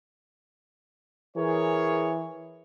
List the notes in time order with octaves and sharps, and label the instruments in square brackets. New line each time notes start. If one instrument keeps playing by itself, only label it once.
[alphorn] E3 [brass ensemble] G#4 A#4 C#5